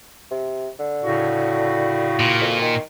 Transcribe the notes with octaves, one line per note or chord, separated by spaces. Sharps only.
C3
D3
A2 C#3 F#4
A#2
F2
D#3